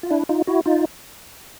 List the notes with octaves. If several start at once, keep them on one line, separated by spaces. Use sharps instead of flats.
F4
D4 E4
D#4 F4
E4 F#4
D#4 F4